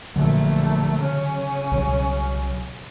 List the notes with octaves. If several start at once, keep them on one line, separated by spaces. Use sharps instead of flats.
A#1 D3 F#3 A3
C#3 C#4
C2 B2 F#3